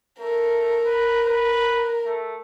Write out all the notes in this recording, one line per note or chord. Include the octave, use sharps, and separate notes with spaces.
A3 A#4
B4
B4
A3